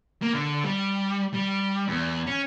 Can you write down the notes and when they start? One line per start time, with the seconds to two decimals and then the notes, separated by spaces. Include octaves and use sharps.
0.22 A#3
0.33 D3
0.64 G3
1.34 G3
1.88 E2
2.27 C#4